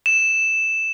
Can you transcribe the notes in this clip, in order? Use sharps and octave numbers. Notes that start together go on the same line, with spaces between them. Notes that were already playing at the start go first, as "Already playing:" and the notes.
E7